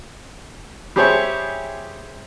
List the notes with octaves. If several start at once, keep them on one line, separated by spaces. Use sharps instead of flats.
G3 G4 G#4 C5 C#5 E5